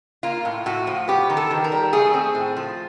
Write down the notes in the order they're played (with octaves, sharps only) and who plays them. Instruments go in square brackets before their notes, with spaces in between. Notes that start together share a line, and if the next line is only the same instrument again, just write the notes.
[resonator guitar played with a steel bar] A#3 F4
A2
A2 F#4
F3
B3 G4
D#3
A4
D#3
A#4
G3
A3 G#4
C4
A2
F3